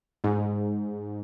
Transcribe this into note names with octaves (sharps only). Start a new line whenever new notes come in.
G#2